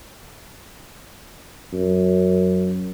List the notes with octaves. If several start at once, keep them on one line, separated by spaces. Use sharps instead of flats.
F#2